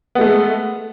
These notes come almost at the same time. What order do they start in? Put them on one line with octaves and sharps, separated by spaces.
B3 G#3 A3